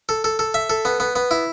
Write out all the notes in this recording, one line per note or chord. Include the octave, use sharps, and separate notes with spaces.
A4
A4
A4
E5
A4
B3
B3
B3
E4